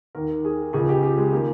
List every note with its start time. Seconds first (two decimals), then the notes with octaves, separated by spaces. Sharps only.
0.15 D#2 A#4
0.20 D#3
0.45 G#4
0.73 C#2 C#3 F3 G#4
0.89 G4
1.03 G4
1.18 G#3
1.33 D#3 A#3